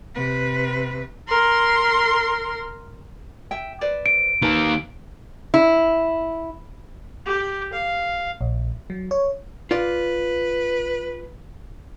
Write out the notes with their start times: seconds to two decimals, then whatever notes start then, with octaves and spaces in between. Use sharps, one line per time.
0.14 C3 B4
1.28 A#4 C6
3.51 E5 G5
3.81 B4 C5 D5
4.06 D7
4.42 D#3 A#3 B4 A5
5.54 E4
7.26 G4
7.73 F5
8.41 A#1
8.90 F#3
9.11 C#5
9.71 F4 B4 D5